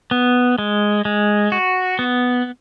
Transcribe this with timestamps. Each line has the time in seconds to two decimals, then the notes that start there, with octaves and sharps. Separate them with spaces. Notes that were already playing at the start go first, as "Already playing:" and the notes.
0.11 B3
0.58 G#3
1.05 G#3
1.52 F#4
1.99 B3